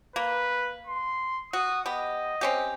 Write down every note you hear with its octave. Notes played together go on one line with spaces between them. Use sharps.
A#3 B4
C6
F#4 D#6
B3 G4 D#5
C4 C#4 G4